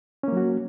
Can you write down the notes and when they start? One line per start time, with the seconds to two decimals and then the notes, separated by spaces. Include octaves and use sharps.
0.23 C#4
0.28 A#3
0.32 F#3
0.37 F#4